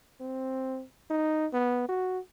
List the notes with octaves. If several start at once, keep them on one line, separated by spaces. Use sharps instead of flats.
C4
D#4
B3
F#4